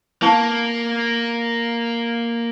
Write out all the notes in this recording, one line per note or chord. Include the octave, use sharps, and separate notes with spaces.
A#3 E4 F5 A5